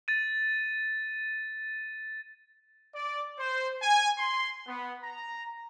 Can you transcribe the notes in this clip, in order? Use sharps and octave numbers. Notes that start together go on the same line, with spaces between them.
A6 D#7
D5
C5
G#5
C6
B3
A#5